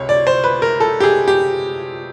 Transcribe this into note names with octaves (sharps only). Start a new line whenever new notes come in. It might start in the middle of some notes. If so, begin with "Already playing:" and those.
Already playing: C#2 C3 C#5
D5
C5
B4
A#4
A4
G4
G#4
G4